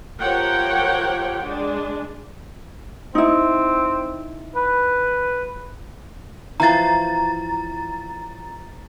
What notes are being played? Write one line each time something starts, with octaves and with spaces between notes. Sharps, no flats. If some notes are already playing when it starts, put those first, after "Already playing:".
F3 G4 A#4 C#5 F#5 G5
G#3 D4
C4 D#4 E4
B4
E3 F3 C5 A#5 A6